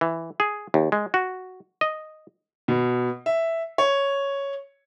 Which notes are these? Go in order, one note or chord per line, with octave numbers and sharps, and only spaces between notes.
E3
G#4
D#2
G#3
F#4
D#5
B2
E5
C#5